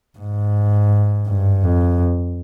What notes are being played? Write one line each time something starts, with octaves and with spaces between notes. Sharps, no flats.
G#2
G2
F2